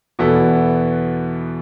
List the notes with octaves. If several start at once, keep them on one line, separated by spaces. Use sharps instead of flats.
E2 B2 B3 E4 A4